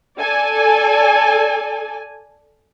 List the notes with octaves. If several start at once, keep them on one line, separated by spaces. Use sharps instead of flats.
A4 D5 G#5